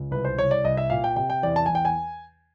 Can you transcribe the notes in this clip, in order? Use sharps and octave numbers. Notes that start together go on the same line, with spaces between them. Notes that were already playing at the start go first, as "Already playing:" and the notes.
Already playing: C#2
C2 B4
C5
C2 C#5
D5
C2 D#5
E5
A#2 F5
G5
C3 G5
G5
E2 D5
A5
E2 G#5
G5
G#5